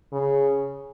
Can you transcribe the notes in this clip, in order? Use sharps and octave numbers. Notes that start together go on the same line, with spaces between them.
C#3